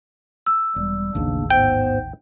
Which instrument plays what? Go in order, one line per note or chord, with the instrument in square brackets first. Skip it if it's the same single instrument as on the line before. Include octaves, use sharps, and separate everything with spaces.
[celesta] E6
[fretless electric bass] E1 [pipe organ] G3
[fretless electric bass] A1 D#2 [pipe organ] C#3 A#3 D4
[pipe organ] G#2 B3 C5 [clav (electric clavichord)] G5